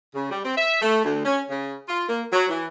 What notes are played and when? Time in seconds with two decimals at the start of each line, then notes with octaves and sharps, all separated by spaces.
0.14 C#3
0.30 G3
0.44 C4
0.57 E5
0.82 A3
1.04 D2
1.25 C#4
1.49 C#3
1.87 F4
2.09 A#3
2.33 F#3
2.49 E3